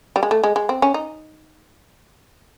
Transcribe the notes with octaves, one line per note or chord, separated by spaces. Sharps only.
G3
G#3
A3
G#3
G#3
C4
C#4
D#4